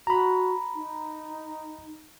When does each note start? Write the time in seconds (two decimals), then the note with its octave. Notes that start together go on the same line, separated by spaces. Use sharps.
0.07 F#4 A#5 B5
0.75 D#4